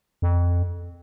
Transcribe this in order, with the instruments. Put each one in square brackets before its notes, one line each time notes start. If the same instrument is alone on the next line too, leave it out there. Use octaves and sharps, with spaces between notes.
[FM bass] F2